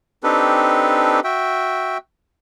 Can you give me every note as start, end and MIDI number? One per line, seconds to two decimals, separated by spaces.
0.23 1.20 60
0.23 1.20 62
0.23 1.20 63
0.23 1.20 67
0.23 1.20 69
0.23 1.20 71
1.24 1.98 66
1.24 1.98 76
1.24 1.98 79